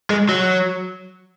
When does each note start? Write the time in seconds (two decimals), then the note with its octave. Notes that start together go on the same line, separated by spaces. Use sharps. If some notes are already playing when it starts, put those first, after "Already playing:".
0.10 G#3
0.29 F#3